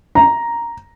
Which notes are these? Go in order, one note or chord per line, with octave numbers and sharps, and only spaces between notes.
A#5